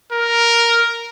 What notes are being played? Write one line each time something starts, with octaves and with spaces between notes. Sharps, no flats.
A#4